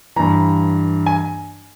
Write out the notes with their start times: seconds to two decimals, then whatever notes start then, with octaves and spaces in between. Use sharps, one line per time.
0.16 G2 E3 A#5
1.06 G#5